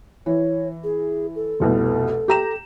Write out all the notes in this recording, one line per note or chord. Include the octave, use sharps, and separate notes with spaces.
E3 C#5
G#4
A4
F1 C2 B2
G4 A#5 E7